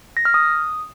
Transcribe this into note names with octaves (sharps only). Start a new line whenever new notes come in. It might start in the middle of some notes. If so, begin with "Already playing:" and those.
A#6
F6
D#6